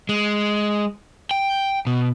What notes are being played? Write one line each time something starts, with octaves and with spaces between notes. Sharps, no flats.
G#3
G5
B2